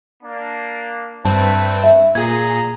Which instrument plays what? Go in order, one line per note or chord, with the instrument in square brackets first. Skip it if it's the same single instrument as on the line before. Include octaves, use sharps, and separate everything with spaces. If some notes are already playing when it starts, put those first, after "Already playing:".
[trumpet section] A#3 D4
[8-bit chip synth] G2 C4 [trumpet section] A3 E4 B4 [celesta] A5
[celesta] E5
[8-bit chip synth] A#2 G#4 [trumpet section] A#5 [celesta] G#6